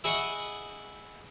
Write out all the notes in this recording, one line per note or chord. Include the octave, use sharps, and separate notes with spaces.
E4 G#4 D#5 F#5 C#6